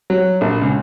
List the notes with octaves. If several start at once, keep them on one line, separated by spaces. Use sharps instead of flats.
F#3
A#1
C#2